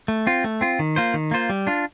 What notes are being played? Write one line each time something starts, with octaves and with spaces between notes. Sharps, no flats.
A3
C4 F4
A3
C4 F4
D#3
A#3 F4 C5
D#3
A#3 F4 C5
G3
D4 F4